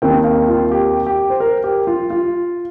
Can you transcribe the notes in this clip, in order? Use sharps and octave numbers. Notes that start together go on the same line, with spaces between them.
D#2 D#3 C4 G5
F5
F4
G4
G4
C5
A#4
G4
F4
F4